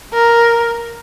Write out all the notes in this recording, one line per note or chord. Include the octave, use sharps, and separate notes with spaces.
A#4